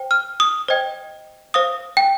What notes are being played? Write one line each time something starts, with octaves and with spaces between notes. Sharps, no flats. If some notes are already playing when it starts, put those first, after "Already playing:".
Already playing: C5 G5
F6
D#6
C5 D#5 G5
C5 F5 D#6
G5